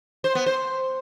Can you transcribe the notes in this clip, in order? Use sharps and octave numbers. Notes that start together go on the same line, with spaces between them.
C5
B3
C5